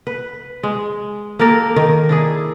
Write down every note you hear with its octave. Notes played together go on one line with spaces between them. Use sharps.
B4
G#3
A#3 G4 A4 A#4
D#3
D4 E4 G#4